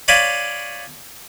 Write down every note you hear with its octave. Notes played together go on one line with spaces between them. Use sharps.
C#5 D5 F5 G5 G#5 B5